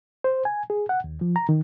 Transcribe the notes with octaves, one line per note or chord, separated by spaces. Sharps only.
C5
G#5
G#4
F#5
D#2
F3
A#5
D#3